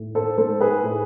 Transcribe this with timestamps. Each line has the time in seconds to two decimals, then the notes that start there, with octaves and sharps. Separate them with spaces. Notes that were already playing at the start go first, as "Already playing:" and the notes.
Already playing: A2
0.15 A4 C5
0.38 G#3 A4 C5
0.60 G#4 B4
0.83 A2